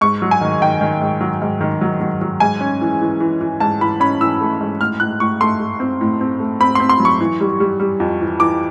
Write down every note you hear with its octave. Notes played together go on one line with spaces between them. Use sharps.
G#2 C#6
F#3
G#5
D#3
D#3 G5
D#3
G#2
F#3
G#2
D#3
F#3
F#3
F#3
G#2 G#5
C#4
E3
E3
E3
E3
G#2 A5
E3 B5
C#4 B5
E3 E6
A3
G#2
A2 F6
A2 F#6
A2 C#6
A3 C6
A3
C4
A2
C4
A3
C4 B5
C6
C4
C6
F#3
C#6
E3
G3
G3
G3
F2
E3
E3 D6